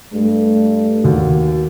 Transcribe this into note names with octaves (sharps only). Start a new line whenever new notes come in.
G2 A3
D#2 F#4